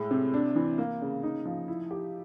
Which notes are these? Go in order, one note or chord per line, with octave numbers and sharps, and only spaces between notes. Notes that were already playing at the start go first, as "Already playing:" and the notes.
Already playing: A2 G#3
C3
D4
E3
A#3
C#3
D#4
F3
E4
G4